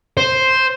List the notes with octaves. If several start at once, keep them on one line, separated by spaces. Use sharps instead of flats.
C5